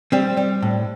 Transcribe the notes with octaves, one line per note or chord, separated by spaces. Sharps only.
G3 C4
G3
A2